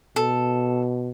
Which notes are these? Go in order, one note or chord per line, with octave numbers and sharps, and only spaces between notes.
B2 A4